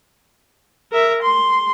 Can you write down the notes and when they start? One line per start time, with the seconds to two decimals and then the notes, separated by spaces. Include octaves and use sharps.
0.92 A#4 E5
1.23 C6